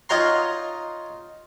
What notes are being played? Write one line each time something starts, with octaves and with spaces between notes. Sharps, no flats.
D#4 F4 C#5 F#5 A#5 C6